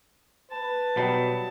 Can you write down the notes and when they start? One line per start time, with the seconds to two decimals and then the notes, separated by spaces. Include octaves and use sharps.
0.52 B4 A5
0.97 B2 F#3 G3 D#4